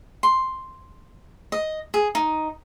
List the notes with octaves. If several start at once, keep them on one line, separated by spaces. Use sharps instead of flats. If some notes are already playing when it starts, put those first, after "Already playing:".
C6
D#5
G#4
D#4